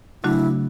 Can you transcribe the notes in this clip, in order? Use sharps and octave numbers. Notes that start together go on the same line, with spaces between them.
C#3 F#3 A3 D4 E4 F#4